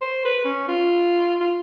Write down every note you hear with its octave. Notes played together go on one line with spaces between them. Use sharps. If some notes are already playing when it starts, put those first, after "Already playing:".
C5
B4
C#4
F4
F4